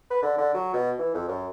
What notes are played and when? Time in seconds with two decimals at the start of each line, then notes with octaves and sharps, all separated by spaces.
0.11 B4
0.23 D3
0.38 D3
0.55 F#3
0.74 B2
0.99 E3
1.15 F2
1.28 F#2